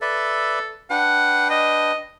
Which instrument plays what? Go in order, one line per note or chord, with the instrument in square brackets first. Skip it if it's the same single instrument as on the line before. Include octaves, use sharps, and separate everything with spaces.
[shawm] A4 [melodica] B4 D5 E5
[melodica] D4 B4 G5 [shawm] F#5
[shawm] D#5